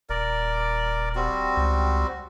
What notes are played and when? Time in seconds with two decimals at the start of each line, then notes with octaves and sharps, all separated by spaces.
0.10 D#1 A#4 D5
1.16 G3 C4 F#4
1.57 C#2